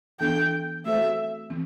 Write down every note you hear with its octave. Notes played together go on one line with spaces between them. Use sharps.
E3 B3 D4 A4 G5
A3 C4 F#4 A4 C5 E5
E3 C4